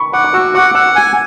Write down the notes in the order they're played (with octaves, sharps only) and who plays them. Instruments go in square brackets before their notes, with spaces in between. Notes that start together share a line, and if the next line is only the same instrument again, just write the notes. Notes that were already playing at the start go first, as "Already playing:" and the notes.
Already playing: [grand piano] B5 C#6
[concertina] F#5 [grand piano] D6
[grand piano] D6
[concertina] F#4 [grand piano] E6
[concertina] F#5 [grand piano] D6
[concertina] F#5 [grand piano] E6
[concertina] G#5